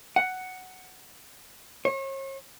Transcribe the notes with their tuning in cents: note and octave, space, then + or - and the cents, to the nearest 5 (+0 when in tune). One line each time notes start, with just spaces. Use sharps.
F#5 +5
C#5 -40